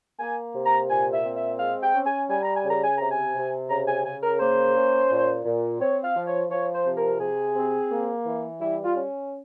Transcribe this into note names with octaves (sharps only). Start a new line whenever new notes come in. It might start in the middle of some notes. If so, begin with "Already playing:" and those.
A#3 G#5
C3
A#5
A#2 G#5
E5
C4
E5
G#3 F5
G5
C#4
G#5
G3 G#5
A#5
G#5
C#3
A#5
G#5
C3 A#5
G#5
C3
C#3 A#5
G#5
C#3 G#5
A#4
A#3 C5
C#4
A#2
A#2
C4 C#5
F5
F3
C#5
F3 C#5
C5
C3
A#4
C3 G#4
C4
A#3
E3
G3 E4
F4
C#4